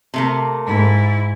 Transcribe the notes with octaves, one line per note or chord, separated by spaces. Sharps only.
C3 A3 A#3
G#2 E4